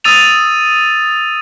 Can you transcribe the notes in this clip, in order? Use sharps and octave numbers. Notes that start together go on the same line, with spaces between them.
D#6 E6 A6 D#7 F7